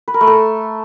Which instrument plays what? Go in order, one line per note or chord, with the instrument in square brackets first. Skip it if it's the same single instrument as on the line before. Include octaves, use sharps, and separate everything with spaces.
[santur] B4
A#4
A3
A4